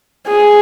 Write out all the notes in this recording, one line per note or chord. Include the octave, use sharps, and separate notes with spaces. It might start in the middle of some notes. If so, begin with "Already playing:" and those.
G#4